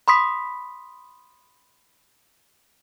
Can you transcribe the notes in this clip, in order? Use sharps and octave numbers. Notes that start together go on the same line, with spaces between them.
B5 C6 D#6 B6